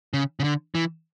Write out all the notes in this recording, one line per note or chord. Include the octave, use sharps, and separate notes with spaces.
C#3
C#3
D3
E3